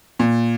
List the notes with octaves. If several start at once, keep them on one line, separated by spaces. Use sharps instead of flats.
A#2